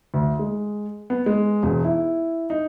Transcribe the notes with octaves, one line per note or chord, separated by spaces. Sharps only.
D2
G#3
B3
G#3
E1
E4
D#4